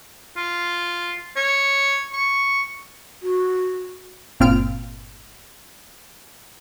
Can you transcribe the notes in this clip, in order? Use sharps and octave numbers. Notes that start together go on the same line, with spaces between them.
F4
C#5
C#6
F#4
G1 A#2 C4 F4 F6 D7